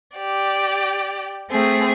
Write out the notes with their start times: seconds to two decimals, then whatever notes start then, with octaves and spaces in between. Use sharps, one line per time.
0.17 G4 D5
1.50 A3 C4 G#4